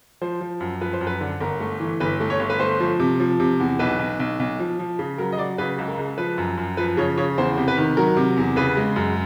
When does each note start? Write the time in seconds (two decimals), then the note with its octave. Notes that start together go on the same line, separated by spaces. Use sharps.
0.22 F3 C5
0.41 F3
0.60 F#2
0.81 F3 B4
0.93 C5
1.01 F#2
1.07 B4
1.21 D3
1.40 G1 A#4
1.60 A3
1.80 E3
2.00 G1 B4
2.20 A3
2.30 C#5
2.40 G1
2.50 B4
2.60 A3 C5
2.80 F3
3.00 C3
3.20 F3
3.40 C3
3.60 E2
3.79 B1 B4
3.99 B1
4.20 B1
4.40 B1
4.59 F3
4.79 F3
4.99 C#3
5.18 F#3 A#4
5.32 D#5
5.38 F#3 D5
5.58 C#3 B4
5.78 C#2
5.88 A#4
5.98 C#2
6.18 F3 B4
6.38 F#2
6.58 F#2
6.77 F3 B4
6.97 C#3 C#5
7.17 C#3 C#5
7.38 E2 C5
7.58 C3
7.68 B4
7.77 D#3
7.97 F#3 A#4
8.17 C3
8.37 E2
8.56 C#3 B4
8.77 G#3
8.96 F#2